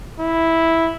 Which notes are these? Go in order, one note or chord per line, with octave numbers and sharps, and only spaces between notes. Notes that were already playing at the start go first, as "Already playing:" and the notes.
E4